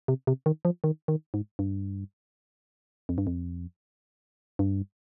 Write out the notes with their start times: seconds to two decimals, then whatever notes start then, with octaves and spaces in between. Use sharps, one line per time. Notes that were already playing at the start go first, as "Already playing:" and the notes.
0.08 C3
0.27 C3
0.46 D#3
0.65 F3
0.84 D#3
1.08 D#3
1.34 G#2
1.59 G2
3.09 F2
3.18 G2
3.27 F2
4.59 G2